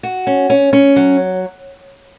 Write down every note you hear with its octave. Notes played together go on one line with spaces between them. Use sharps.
F#4
C#4
C#4
C#4
F#3